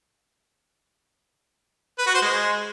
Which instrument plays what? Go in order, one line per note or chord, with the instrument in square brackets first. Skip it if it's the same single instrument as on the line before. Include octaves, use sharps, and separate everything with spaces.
[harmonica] B4
F#4
C5
G#3